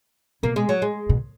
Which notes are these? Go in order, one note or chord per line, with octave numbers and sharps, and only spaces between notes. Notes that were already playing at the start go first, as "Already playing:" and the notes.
B2 A#3
G#3
F#3
G#3
B2